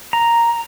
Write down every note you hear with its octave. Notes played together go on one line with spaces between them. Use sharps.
A#5